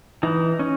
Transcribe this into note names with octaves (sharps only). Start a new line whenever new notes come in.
E3 D#4
C#4